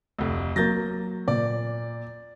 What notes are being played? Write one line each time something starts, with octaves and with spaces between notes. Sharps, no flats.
F1 D2
F#3 A#3 G6 A6 A#6
A#2 D5